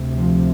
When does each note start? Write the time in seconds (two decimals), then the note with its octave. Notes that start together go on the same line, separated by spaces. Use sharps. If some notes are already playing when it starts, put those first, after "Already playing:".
Already playing: D2 C3
0.18 F3